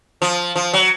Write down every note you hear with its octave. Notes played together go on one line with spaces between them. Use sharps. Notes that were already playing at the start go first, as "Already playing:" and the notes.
F3
F3
F#3